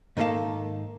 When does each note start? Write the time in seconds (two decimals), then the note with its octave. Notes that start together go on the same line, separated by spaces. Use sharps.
0.17 G#2 D#3 A#3 A4 F5 A5